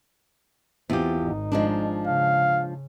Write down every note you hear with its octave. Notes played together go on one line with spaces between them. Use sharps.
E2 C4 F4 G4
G#1 D#4
F3 G#3 D4
C#3 F5